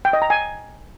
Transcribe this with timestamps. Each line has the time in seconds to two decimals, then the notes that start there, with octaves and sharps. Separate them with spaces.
0.05 G5
0.13 D#5
0.22 A#5
0.30 G#5